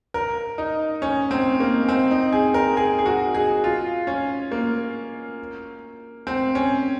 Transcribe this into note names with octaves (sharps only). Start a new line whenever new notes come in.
A#4
D#4
C#4
C4
A#3
C4
D#4
G#4
A#4
G#4
G#4
F#4
G#4
F4
C#4
A#3
C4
C#4